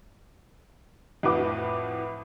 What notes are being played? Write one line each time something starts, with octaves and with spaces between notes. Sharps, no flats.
F2 A2 F#4 B4 D6